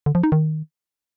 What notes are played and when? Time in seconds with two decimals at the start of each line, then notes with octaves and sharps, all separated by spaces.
0.06 D3
0.15 F3
0.23 D#4
0.32 D#3